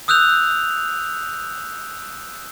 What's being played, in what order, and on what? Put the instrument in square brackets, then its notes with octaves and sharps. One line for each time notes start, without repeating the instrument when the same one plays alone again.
[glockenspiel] D#6 E6 F#6 G6 F7